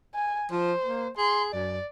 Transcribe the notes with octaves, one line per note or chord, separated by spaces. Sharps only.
G#5
F3 C5
A#3
G#4 C6
F#2 D5